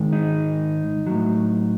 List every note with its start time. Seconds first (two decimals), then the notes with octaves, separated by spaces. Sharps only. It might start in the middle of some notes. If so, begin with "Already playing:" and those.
Already playing: G#2 D#3 G#3
0.13 D#4
1.07 A2 F#3